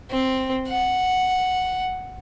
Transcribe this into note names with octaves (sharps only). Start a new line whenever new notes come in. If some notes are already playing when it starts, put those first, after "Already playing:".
C4
F#5